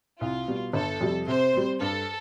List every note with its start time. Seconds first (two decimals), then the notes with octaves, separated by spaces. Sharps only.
0.21 C2 F4
0.48 B2 G3
0.73 G1 A4
1.01 F2 C3 G3
1.27 C3 C5
1.53 G3 C4
1.80 G2 A4